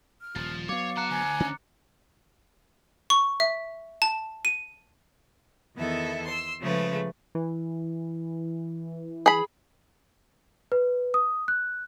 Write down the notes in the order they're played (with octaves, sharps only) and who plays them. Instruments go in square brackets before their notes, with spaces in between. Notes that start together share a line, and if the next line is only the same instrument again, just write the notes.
[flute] F6
[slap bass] D#1 [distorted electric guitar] F3 [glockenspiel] A6
[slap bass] F#3 B3 [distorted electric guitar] C#5 [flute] F5 [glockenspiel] D6
[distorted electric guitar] F#5 A5 [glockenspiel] A#5 F#6 C#7
[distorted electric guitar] D2 [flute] G#5
[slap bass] D3 C#4
[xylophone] C#6
E5
A5
D#7
[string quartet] E2 D#3 B3 E4 A4 E5
C6 E6
C#3 F3 G#3 A3 B4
[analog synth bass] E3
[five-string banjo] G#4 B5
[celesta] B4
D#6
F#6